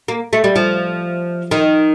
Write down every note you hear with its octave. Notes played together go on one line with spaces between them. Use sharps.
A#3
A3
G3
F3
D#3